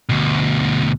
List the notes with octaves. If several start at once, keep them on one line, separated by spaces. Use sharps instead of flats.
D2 B2